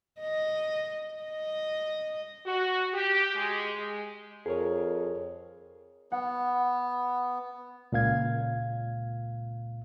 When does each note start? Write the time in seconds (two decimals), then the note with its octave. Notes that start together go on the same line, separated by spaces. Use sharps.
0.20 D#5
1.23 D#5
2.46 F#4
2.94 G4
3.34 G#3
3.76 G#3
4.46 F2 G#4 A#4 C#5
6.12 B3 F#5
7.92 C#2 A#2 F5 G#6